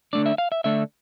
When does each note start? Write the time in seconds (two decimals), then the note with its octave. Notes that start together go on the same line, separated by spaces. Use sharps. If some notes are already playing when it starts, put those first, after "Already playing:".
0.13 D3 A3 D4 D5
0.26 E5
0.38 F5
0.52 E5
0.64 D3 A3 D4 E5